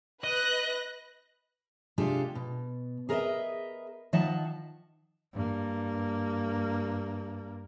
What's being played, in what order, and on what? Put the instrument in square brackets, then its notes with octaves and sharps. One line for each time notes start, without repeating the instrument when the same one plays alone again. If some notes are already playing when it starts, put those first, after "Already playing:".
[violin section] B4 F#6 A#6 [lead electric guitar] D#5
[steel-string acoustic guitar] C3 G#3 D4 F4 G4 A4
B2
G#4 A#4 B4 C#5 D#5 E5
D#3 F3 D#5 E5 F#5 A5
[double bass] G2 A#3